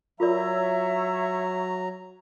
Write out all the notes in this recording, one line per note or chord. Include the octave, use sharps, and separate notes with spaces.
F#3 F4 A#4 C#5 D5 E5 A#5